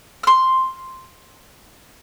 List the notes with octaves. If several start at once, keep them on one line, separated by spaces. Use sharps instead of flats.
C6 F6